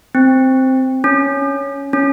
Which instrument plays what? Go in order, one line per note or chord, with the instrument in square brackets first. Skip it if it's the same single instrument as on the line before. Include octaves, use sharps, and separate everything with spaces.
[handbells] C4
C#4
C#4